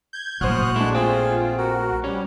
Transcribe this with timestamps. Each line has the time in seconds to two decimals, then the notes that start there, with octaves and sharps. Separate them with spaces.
0.13 G6 G#6
0.41 A#1 F#2 A2 F#4 C5 D#6 F6 F#6
0.76 G#3 A3 D4 E4
0.94 A3 C4 F4 G#4
1.58 F#4 A#4
2.04 G3 C#4